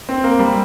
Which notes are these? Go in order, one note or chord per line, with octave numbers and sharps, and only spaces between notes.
C4
A#3
G3